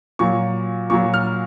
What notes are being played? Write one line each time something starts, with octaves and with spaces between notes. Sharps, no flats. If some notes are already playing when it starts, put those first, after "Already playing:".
A#2 F#3 C#6
A#2 F#3 C#6
F6